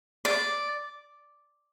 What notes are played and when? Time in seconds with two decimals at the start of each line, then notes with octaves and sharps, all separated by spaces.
0.25 D5